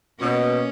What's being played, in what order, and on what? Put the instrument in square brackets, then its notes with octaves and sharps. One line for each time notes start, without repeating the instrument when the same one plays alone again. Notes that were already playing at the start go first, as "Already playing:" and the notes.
[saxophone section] B2 [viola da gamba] A#3 C#4